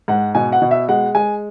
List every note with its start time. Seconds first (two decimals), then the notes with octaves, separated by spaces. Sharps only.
0.08 G#2 F#5
0.35 B2 G#5
0.52 F#5
0.62 B2
0.71 E5
0.89 G#3 F#5
1.15 G#3 G#5